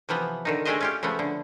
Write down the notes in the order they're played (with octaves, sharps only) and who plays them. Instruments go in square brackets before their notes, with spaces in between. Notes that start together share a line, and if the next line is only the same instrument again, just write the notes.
[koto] C3 E3 F3 B3
D3 D#3 D#4
G#3 A3 D4 G4 C5 D#5
C#4 F4 G4
C#3 F3 A3 B3
D3